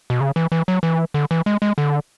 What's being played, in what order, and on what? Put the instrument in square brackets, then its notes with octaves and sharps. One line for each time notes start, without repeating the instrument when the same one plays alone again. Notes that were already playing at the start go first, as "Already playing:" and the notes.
[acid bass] B2
C#3
E3
E3
F#3
E3
D3
E3
G#3
G#3
D3